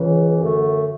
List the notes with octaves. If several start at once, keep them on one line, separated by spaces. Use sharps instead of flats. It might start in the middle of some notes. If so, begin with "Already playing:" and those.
Already playing: C#2 C#3 E3
F#2 D3 A3